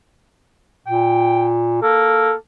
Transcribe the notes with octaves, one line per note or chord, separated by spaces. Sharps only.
A#2 G5
A#3 A4